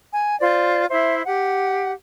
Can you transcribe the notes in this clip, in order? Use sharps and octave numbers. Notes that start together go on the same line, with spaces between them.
G#5
F4 C5 D5
E4 C5 E5
G4 F#5